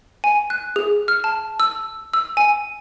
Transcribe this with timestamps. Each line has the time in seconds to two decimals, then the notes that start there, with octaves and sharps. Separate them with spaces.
0.24 G#5
0.50 F#6
0.76 G#4
1.08 F6
1.24 A5
1.60 E6
2.13 E6
2.37 G#5